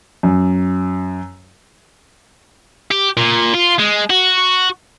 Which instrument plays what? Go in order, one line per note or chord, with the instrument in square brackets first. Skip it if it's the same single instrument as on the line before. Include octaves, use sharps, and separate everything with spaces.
[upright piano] F#2
[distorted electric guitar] G4
A#2
F4
G#3
F#4